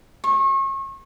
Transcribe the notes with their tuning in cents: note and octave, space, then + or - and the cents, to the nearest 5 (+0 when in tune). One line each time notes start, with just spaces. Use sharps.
C#6 -35